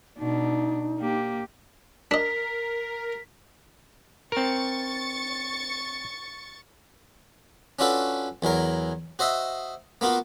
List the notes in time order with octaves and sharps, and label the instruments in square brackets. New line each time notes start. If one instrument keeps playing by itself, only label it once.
[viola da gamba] B2 D4 [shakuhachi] D#4
[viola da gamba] A#3 G4
[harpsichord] D4 D#5 [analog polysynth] A#4 [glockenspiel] B6
[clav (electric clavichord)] C4 A#4 [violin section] C#6 A6 C#7
[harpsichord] C#4 D4 F4 F#4 A4 B4
E2 E3 F#3 A#4
F#4 C5 D#5 E5
A#3 B3 F4 F#4